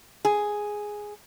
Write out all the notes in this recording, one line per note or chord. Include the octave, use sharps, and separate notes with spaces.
G#4